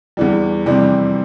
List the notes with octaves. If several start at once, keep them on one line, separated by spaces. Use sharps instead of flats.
E2 E3 G3
F2 C3 E3 G3 C4